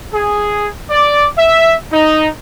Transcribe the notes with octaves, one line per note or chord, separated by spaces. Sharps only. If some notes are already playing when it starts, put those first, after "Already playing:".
G#4
D5
E5
D#4